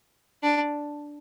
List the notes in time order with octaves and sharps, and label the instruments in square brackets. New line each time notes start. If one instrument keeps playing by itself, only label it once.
[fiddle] D4